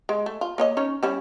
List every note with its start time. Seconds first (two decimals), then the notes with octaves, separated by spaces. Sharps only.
0.09 G#3
0.26 A3
0.41 F4
0.58 A#3 C#5 D#5
0.77 C#4 D#4 C#5
1.03 G3 C#4 E4